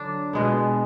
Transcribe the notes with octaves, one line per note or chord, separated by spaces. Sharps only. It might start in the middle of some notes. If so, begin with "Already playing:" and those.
Already playing: D3 F#3 D4
B2 G#3 B3